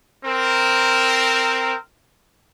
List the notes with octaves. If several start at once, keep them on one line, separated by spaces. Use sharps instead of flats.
C4 A#4